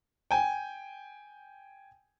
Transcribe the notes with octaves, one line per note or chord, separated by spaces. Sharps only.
G5 G#5